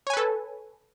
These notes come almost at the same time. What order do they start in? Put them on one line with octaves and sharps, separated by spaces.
C#5 G#5 B4 A4